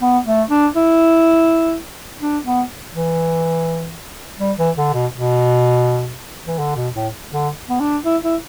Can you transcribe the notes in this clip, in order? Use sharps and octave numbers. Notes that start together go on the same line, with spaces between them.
B3
A3
D4
E4
D4
B3
E3
G3
E3
D3
B2
B2
E3
D3
B2
A2
D3
B3
D4
E4
E4